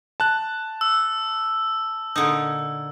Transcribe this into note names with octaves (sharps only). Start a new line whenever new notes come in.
A5 F#6
E6
A#2 D3 D#4